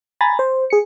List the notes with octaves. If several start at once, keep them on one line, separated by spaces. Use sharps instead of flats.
G#5 A#5 B5 A6 A#6
C5
G#4 C#7